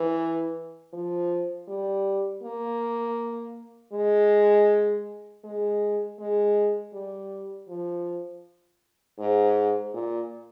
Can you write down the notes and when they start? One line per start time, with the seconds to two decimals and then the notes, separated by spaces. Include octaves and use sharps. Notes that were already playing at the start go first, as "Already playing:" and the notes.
Already playing: E3
0.93 F3
1.68 G3
2.43 A#3
3.93 G#3
5.44 G#3
6.19 G#3
6.93 G3
7.69 F3
9.19 G#2
9.94 A#2